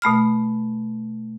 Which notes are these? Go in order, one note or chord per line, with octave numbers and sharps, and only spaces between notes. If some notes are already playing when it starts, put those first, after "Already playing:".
B2 A3 B5 F6